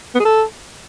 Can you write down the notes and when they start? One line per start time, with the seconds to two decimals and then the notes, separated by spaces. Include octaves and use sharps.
0.15 B3
0.20 G#4
0.25 A4